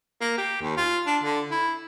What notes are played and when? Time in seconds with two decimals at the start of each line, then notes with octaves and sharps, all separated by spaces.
0.21 A#3
0.37 G4
0.61 D#2
0.77 F4
1.07 D4
1.24 D3
1.51 E4